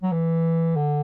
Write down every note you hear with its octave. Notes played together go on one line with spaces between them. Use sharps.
F#3
E3
D3